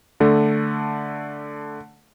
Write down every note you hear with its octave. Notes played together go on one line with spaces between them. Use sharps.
D3 A3